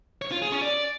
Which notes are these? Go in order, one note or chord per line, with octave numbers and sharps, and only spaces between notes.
C#5
F4
G#4
C#4
D5